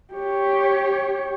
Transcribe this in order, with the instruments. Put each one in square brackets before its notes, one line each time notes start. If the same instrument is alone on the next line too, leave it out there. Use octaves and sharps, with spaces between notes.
[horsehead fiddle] G4 C#5